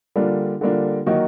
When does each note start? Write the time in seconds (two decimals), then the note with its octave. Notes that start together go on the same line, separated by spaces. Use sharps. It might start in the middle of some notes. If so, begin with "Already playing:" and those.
0.16 D3 G3 A#3 D4 F4
0.61 D3 G3 A#3 D4 F4
1.06 D#3 F#3 A#3 D#4 F#4